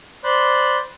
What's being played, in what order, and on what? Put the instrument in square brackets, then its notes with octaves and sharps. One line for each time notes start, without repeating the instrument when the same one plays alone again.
[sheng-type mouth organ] C5 D5 B5 F#6